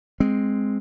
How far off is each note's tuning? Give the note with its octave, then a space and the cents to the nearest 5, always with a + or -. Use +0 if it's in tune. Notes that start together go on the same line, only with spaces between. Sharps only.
G#3 +0 C4 +0